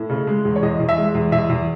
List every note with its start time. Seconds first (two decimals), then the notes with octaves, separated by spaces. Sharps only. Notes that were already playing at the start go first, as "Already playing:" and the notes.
Already playing: A2
0.10 C#3
0.27 G#3
0.45 E2
0.56 C#5
0.62 E2 D#5
0.80 E2
0.89 E5
0.97 G#3
1.15 E2
1.32 E2 E5
1.50 E2